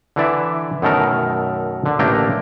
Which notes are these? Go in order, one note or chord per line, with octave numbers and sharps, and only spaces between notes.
D3 E3 D5 E5
F#2 B2 D#3 A3 A4 A#4
D3
A1 A3 A#3 D4 G5 A#5